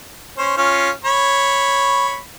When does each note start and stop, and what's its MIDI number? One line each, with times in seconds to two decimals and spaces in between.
0.38 0.54 61
0.38 0.54 72
0.57 0.90 61
0.57 0.90 65
1.04 2.18 73
1.04 2.18 83